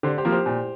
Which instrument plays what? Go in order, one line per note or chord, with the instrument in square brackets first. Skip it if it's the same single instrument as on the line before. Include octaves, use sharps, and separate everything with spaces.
[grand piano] D3 [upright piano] G4 C5
[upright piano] G4 C5
[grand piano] F3 A#3
[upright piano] G4 C5
[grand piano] A#2